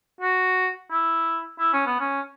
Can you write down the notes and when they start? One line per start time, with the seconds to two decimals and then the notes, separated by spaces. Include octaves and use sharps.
0.21 F#4
0.91 E4
1.60 E4
1.73 C#4
1.87 B3
2.00 C#4